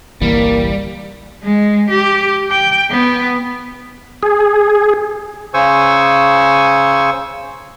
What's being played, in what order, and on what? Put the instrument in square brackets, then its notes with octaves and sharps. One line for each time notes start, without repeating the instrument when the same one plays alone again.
[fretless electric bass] G1 C2 E3 [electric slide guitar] G3 [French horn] A#3
[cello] G#3
G4
G5
B3
[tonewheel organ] G#4
[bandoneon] C#3 C5 G#5 C#6 E6